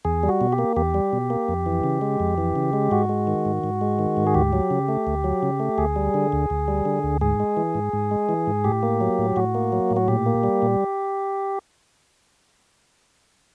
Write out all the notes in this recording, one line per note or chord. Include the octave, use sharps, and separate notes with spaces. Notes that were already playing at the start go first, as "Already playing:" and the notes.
E2 G#4
G3
F#4
B2
G4
A#3
E2 G4
G3
B2
A#3
F2
E3
C#3
G#3
F2
E3
C#3
G#3
G#2 F#4
G#3
D#3
G#2
G#2
G#3
D#3
G#2
G#4
D2 G4
F#3
C#3
A3
D2
F#3
C#3
A3
D2 G#4
G3
D3
D2
D2
G3
D3
D2
G#2 G#4
G#3
E3
G#2
G#2
G#3
E3
G#2
A2 G4
A#3
F#3
A2
A2 F#4
A#3
F#3
A2
F#4
A#2 G4
A#3
G3
A#2